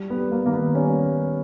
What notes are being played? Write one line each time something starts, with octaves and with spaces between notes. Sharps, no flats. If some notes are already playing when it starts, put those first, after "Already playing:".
Already playing: G3
B3
G3
A#3
D#3 A#3
B3
G3 C#4
G3